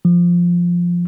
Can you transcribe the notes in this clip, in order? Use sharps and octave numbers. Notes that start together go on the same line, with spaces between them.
F3